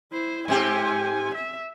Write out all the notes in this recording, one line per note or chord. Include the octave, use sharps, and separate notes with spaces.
E4 C5
G#2 C4 G4 G#5
E5